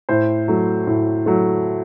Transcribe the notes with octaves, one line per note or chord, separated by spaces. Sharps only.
A2 C5
F#3 A3
A2
F#3 A3